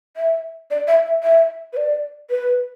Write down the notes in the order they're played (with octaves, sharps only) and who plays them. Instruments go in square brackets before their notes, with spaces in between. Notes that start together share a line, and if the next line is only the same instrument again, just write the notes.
[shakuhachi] E5
D5
E5
E5
E5
B4
D5
B4